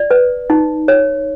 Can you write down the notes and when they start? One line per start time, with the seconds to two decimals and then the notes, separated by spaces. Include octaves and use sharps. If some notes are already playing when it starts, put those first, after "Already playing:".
Already playing: D5
0.11 B4
0.50 D#4
0.88 C#5